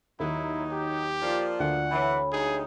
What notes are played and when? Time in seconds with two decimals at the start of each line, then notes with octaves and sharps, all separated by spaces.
0.20 D#2 F#3 D#4 E4
0.72 G4
1.22 F3 A#3 F4 D5
1.60 D2 F#5
1.91 E3 C#5 B5
2.32 G3 G#3 D#4 G#4 C#5